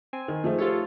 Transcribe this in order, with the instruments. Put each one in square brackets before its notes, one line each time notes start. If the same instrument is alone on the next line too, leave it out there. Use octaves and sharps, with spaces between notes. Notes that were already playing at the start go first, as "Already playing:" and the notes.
[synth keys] C4 G#5
[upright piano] D#3
[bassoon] G#2 [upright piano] F3 A3
[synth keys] F4 A4 C#5 [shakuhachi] G4